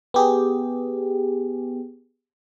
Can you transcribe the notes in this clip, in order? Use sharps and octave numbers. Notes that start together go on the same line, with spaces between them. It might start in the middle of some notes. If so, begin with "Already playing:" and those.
B3 G4 G#4